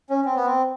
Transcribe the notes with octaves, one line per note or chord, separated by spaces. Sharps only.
C#4
C4
B3
C4